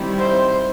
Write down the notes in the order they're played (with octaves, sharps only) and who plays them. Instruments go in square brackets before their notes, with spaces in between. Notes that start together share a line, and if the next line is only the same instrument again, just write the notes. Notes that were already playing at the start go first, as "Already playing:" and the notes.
Already playing: [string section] D#3 G3 C4 E4
[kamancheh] C5